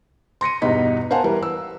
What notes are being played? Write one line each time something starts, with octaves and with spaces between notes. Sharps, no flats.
C6 A#6 C#7 D#7
E2 G2 B2 D#4 B4 B6
A#4 C5 F5 F#5 G#5 A5
E3 G3 A#4 B4
E6